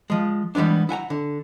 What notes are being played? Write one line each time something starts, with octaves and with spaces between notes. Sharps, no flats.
F3 G#3
E3 G3 G#3 B3 D4
E4 F#5 G#5 A#5
D3